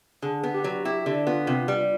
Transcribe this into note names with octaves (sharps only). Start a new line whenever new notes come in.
D3 G#4
B3
G4
F#3
E4 G4
D3
B3 F4
C3
G3